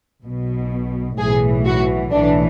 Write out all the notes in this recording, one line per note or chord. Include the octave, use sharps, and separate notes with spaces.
B1 B2
B1 A2 E3 G#4
F#4
B1 A2 E3 D4